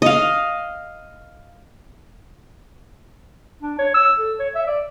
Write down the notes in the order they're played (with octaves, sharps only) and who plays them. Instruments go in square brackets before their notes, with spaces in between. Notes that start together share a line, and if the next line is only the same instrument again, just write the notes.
[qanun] D#5 F5
[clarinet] D4
C#5
E6
A4
C#5
E5
D5